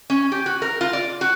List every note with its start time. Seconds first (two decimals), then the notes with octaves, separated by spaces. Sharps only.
0.10 C#4
0.32 G4
0.46 F#4
0.62 A#4
0.81 F4
0.93 D5
1.21 F#4